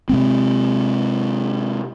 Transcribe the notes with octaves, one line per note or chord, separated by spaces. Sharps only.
C3 G#3 C4